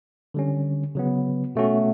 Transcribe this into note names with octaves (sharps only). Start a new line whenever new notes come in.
D3 G3 C#4
C#3 F#3 B3
B2 A3 C#4 F#4